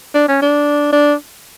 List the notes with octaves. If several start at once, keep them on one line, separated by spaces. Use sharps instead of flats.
D4
C#4
D4
D4